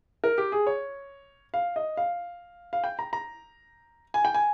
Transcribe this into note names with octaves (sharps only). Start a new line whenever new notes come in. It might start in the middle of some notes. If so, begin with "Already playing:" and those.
A#4
G4
G#4
C#5
F5
D#5
F5
F5
G5
A#5
A#5
G#5
G5
G#5